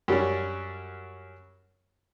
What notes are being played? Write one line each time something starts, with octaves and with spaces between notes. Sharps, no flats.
F#2 G3 C#4